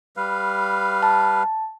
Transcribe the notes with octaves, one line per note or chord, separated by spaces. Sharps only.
G3 B4 F5
A5